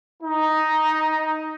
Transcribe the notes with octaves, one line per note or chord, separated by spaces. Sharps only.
D#4